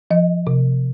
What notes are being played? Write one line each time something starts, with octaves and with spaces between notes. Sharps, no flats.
F3 D#5
C3